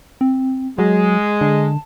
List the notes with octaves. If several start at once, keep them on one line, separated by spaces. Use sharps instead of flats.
C4
F#3 G#3 D#5
D3 A5